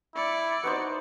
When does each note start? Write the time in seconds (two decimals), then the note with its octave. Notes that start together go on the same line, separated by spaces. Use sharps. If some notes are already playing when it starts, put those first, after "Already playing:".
0.15 E4 D5 C#7
0.64 B3 D#4 F#4 C5